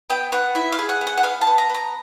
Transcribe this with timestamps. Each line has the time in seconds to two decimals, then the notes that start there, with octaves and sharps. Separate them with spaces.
0.10 B3 G5
0.32 B3 F#5
0.55 E4 E5
0.72 F5
0.79 G#4
0.89 F#5
1.01 B3
1.07 F#5
1.17 F#5
1.23 B3 F5
1.41 A5
1.47 B3
1.58 A#5
1.69 B3 A#5